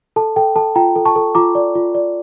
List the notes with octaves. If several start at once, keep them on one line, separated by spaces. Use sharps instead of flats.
A4 A5
A4 G5
A4 A5
F4 G5 A#5
A4
A5 C#6
A4
F4 A#5 D6
D5
F4
D5